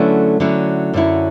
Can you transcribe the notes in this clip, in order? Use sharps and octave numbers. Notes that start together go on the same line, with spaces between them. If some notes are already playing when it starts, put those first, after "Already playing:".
Already playing: D3 F#3 A3 C#4 E4 B4
D3 F#3 A3 C#4 E4
F#2 D3 F#3 C#4 E4